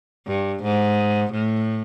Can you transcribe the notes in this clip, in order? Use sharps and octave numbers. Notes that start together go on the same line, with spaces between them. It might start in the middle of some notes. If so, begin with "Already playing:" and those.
G2
G#2
A2